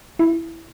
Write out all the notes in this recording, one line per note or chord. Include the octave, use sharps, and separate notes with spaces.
E4